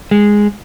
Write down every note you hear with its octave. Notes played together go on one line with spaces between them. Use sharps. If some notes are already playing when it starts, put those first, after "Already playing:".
G#3